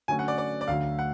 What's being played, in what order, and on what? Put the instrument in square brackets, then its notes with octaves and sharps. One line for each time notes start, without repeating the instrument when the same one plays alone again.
[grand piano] D3 F#3 A3 C#4 F#4 [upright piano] G#5
[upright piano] F#5
D5
D5
D5
[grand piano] D2 D3 F#3 [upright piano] F5
[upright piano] F#5